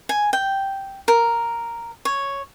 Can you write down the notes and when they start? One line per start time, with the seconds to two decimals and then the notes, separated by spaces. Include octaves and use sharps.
0.09 G#5
0.33 G5
1.08 A#4
2.05 C#5